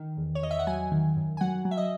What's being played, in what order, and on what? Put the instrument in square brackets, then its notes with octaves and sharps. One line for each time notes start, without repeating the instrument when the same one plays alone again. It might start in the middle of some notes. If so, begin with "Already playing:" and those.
Already playing: [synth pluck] D#3
E2
C#5
E2 D#5
E5
F#5
F#3 G#5
D#3
F#2
G#5
F#3 F#5
F#3
E5
D#5